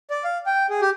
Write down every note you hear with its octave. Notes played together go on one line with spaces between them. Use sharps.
D5
F5
G5
G#4
G4